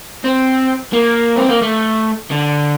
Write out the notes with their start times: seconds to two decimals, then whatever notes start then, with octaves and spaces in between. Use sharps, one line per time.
0.24 C4
0.93 A#3
1.37 C4
1.49 A#3
1.62 A3
2.31 D3